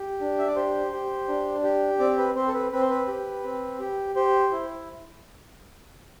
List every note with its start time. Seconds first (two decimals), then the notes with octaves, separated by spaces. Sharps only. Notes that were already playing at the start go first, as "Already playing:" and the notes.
Already playing: G4
0.20 D4
0.38 E5
0.47 D5
0.56 G4 C5
0.92 G4
1.28 D4
1.63 G4
1.99 C4 D5
2.18 B4
2.35 C4 C5
2.48 A4
2.54 B4
2.72 C4 B4
2.80 C5
2.90 B4
3.07 G4
3.44 C4
3.79 G4
4.15 G4 C5
4.52 E4